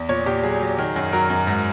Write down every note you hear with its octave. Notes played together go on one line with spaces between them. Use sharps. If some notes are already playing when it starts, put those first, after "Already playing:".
Already playing: E2
A#2 C#5
A#2 G4
F#3 G#4
F#3
D#3
F#2
F#3 A#4
F#2
G#2